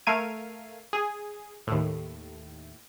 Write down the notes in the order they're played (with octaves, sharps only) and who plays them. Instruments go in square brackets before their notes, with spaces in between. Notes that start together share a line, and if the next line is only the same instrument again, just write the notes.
[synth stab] A3 A#4 F5 G#6 D#7
G#4
D#2 A2